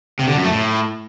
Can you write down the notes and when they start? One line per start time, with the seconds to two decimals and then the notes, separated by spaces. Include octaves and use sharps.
0.19 C3
0.27 D3
0.35 F#2
0.44 A3
0.52 A2